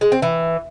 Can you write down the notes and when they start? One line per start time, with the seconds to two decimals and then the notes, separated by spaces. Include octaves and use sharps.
0.01 G#3
0.12 C4
0.22 E3